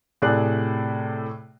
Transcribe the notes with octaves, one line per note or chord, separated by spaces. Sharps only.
A2 C3 G#4 D5 F#6